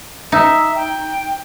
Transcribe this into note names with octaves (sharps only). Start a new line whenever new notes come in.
D#4 E5
G5